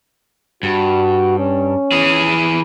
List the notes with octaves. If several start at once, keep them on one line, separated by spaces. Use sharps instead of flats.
G2 F#4
C#4
E3 G#4